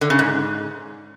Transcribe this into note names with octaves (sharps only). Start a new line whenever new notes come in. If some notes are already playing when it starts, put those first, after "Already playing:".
D3
C#3
G#2